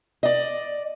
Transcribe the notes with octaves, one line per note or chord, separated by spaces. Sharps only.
D5 D#5